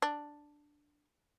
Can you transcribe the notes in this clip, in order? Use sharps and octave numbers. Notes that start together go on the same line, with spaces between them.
D4